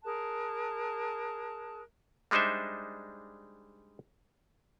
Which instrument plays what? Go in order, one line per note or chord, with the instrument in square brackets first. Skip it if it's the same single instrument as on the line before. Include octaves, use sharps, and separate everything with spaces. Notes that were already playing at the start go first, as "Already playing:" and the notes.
[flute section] G#4 A#4 A5 F#6
[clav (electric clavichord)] G3 G#3 D4 D#4 C5 E5